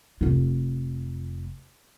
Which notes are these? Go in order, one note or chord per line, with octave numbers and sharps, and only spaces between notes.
F1 F4